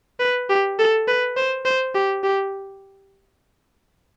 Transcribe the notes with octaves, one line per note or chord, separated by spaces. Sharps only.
B4
G4
A4
B4
C5
C5
G4
G4